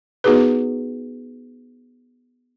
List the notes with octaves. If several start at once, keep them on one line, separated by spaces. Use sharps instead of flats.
B3 D#4 F#4 G#4 B4